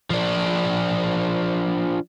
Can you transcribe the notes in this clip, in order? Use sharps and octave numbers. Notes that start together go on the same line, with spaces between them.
F3 D4